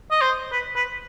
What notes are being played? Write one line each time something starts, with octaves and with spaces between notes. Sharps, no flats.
D#5
C5
B4
B4